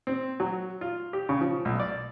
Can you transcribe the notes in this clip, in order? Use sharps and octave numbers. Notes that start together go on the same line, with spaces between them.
C4
F#3
F4
G4
C#3
F3
B1
D5